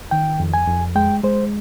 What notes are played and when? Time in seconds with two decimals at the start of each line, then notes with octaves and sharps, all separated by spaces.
0.11 D#3 G5
0.40 F2
0.54 G#5
0.68 F2
0.95 G#3 G5
1.23 G#3 C5